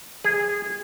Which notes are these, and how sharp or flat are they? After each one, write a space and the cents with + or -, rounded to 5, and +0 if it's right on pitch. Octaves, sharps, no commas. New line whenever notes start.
G#4 -20